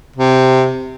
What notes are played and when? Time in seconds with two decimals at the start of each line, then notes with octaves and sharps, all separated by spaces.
0.16 C3